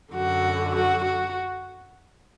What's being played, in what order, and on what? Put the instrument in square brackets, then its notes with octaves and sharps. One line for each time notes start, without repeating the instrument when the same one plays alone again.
[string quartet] F#2 D3 F#4
F#4
F#4